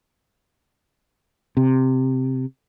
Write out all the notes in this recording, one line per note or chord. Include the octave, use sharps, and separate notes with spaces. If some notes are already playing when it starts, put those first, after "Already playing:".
C3